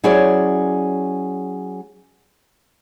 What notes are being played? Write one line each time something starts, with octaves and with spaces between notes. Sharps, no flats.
F#3 C#4 E4 G#4 C#5 D5